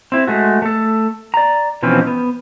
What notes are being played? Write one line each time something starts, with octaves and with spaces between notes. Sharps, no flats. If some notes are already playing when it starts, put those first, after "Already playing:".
C4 E4
G#3 A3 F#4
A3 A4
D5 A#5
B2 E3 F3 C4 C#4
B3